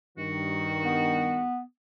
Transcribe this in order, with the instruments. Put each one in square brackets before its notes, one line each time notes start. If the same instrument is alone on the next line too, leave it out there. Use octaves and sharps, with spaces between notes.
[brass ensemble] G2 D#3 [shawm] F#4
[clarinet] B3